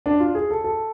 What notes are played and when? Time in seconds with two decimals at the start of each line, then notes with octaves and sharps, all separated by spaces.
0.06 D4
0.20 F4
0.35 G#4
0.50 A4
0.64 A4